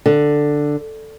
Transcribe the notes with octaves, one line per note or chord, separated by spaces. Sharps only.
D3